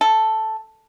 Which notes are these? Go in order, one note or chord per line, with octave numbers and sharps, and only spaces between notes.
A4